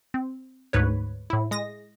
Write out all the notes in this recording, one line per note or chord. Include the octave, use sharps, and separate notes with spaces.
C4
D2 G#2 B4 C#5
A2 E4
G#3 D#6 A#6